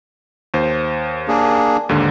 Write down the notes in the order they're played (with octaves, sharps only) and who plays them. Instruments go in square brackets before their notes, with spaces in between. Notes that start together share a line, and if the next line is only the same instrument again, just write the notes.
[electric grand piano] D#2 C5
[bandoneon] A#3 D4 G#4
[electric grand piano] D#2 G#2 D3